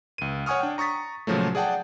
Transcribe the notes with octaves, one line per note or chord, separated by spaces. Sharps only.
C#2 D#7
C#5 F#5 G#5 C#6 D#6 F6
D4 G5
A#5 C#6 D#6 A6 B6
A#2 C#3 F3 F#3 A3
G#4 D5 F#5 G5 A5